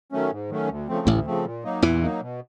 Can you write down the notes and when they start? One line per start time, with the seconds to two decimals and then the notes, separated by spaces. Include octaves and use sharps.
0.12 D#3 F#3 A3 C#4
0.32 G#2
0.50 D#3 F#3 A3 C#4
0.69 D2
0.88 C#3 F3 A3 C4
1.07 A1 D2 A2
1.26 C#3 F3 A3 C4
1.45 A#2
1.64 F#3 A#3 D#4
1.82 E2 A#2 E3
2.02 F#3 A#3 D#4
2.21 B2